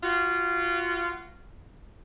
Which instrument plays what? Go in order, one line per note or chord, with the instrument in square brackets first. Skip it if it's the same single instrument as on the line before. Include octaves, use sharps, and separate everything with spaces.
[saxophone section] F4 F#4